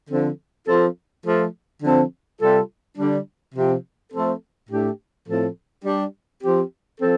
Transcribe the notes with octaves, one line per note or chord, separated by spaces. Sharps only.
D3 F3 C4 A4
F3 C4 F4 A4
F3 A3 F4 A4
D3 F3 C4 A4
C3 G3 F4 A4
D3 G3 D4
C3 F3 C4 G4
F3 A3 C4 A4
A2 A3 D4 G4
A2 F3 C4 A4
G3 D4 G4
F3 C4 G4
F3 C4 A4